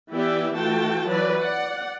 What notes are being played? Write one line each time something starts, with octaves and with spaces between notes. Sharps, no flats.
E3 B3 E4 G4 D5 E5
E3 A3 F4 F#4 G5 A5
E3 F#3 B4 D5
D5 F#5